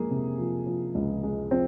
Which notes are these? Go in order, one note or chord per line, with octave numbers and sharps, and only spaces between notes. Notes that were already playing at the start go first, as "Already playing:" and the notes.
Already playing: F3 G#3 A#3 G#4
C3
F3
F3
C#2
G#3
F3 C4